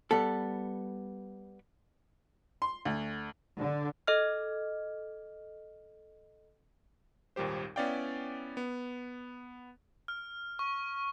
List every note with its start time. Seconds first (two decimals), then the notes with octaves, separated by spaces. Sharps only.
0.11 G3 B3 A4
2.62 C6
2.85 D2
3.59 D3
4.07 A4 D#5 F6
7.36 G#1 D#2 A#2 G3 G4 C5
7.76 B3 C#4 E4 D5 F5 G5
8.57 B3
10.08 F6
10.59 C#6